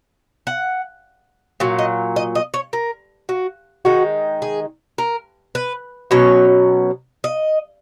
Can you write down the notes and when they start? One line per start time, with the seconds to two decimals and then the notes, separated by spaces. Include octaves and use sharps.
0.47 F#5
1.60 A#2 F#3
1.79 D#5
2.16 D#5
2.35 D#5
2.54 C#5
2.73 A#4
3.29 F#4
3.85 D#3 G#3 D#4 F#4
4.42 G#4
4.98 A#4
5.55 B4
6.11 B2 F#3 C#4 C#5
7.24 D#5